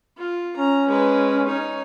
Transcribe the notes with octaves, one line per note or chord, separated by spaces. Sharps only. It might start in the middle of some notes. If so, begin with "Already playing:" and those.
F4
C#4 A#5
G#3 B4
D#4 C#5